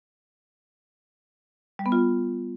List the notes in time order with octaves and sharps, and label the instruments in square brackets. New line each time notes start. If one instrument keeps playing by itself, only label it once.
[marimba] G3
B3
F4